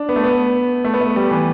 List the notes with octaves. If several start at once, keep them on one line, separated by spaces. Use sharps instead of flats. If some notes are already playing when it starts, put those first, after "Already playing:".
Already playing: D4
B3
A3
B3
A3
B3
A3
G3
E3